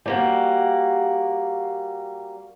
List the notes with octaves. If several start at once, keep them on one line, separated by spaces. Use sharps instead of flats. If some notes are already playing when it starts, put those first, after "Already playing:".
G3 A#3 F#4